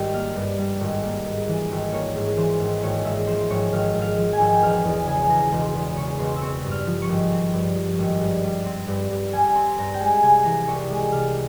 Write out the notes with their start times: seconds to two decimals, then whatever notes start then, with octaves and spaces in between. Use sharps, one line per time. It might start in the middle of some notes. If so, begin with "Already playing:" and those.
Already playing: G#1 G3 G5
0.13 A#3 F5
0.35 G2
0.58 G3
0.81 G#1
1.03 A#3
1.25 G#2
1.48 E3
1.71 G#1
1.93 A#3 C#5
2.15 G#2
2.37 E3 C5
2.60 G#1
2.83 G#1 C#5
3.05 G#2 E5
3.27 F3 C5
3.50 G#1 C#5
3.72 G#1 F5
3.94 G#2
4.02 F5
4.18 F3
4.33 G#5
4.39 G#1
4.55 G5
4.62 E1 F5
4.85 E2
5.07 C#3 G#5
5.29 E1 A#5
5.52 E1 C6
5.75 E2
5.97 C#3 C#6
6.19 E1 C6
6.36 E6
6.41 C4 C#6
6.64 G2
6.71 F6
6.87 F3
7.02 C#6
7.09 G#1
7.31 C4
7.54 G2
7.76 F3
7.99 G#1
8.21 G2
8.44 G3
8.66 C4
8.88 G2
9.11 G2
9.33 G3 G#5
9.55 C4 C6
9.78 G2 A#5
9.94 G5
10.00 G#3 G#5
10.22 C3 G#5
10.45 E3 A#5
10.67 C2 C#6
10.90 G#3
11.12 C3 F6